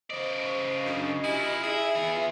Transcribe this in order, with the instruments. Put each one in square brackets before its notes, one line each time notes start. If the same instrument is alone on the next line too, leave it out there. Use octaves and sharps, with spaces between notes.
[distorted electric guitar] C#3 D5 [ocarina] C5 [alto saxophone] D#5
[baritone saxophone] F#2 [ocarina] D4
[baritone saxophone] E4 [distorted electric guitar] F4 G#5 [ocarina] G4
[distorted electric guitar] E4 [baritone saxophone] G#4 [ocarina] E5
[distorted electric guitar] E3 B3
[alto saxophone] F4